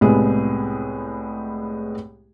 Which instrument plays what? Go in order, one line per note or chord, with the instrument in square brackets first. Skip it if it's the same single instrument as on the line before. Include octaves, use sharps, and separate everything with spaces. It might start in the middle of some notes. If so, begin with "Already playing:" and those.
[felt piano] C2 A2 G#3 B3 G#4